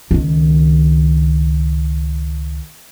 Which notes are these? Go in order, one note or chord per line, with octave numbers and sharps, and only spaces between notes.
C#2 D#3